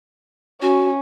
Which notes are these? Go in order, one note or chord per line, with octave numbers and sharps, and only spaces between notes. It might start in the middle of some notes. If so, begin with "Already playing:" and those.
C#4 F#4